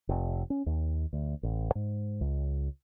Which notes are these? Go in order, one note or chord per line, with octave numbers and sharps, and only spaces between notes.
F1
C#4
D#2
D2
A1
G#2
C#2